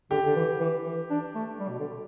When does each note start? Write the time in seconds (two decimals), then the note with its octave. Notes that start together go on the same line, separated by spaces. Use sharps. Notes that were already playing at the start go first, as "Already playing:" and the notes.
0.11 D3 G4
0.26 D3
0.36 E3
0.60 E3
0.86 E3
1.10 D4
1.35 A3
1.60 G3
1.69 B2
1.79 D3